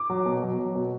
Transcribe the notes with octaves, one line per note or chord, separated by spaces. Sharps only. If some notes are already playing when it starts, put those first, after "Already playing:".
Already playing: D6
F#3
B2
F#3
F#3
B2